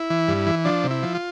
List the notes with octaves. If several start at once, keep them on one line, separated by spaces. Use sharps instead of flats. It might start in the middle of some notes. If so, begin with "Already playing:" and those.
Already playing: E4
E3
G2
E3
F3 D4
C3
E4
F3
F4